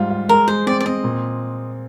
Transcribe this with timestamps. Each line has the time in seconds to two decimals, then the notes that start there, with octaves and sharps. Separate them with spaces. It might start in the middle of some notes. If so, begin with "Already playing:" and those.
Already playing: G#2 G3 F4
0.10 F4
0.29 G#3 A#4
0.48 G#3 C5
0.66 C4 D5
0.81 D5
0.85 C4 D#5
1.04 A#2